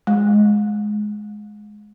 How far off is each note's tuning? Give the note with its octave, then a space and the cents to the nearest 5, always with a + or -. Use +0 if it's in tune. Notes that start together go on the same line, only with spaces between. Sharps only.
G#3 +10